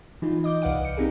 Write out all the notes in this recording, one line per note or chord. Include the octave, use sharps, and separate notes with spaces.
E3 D#4 F4
D#5 D6 G6
C2 B4 D5 F5 F#5 D7
C#7
C4 D#4 G4 G#4 A#4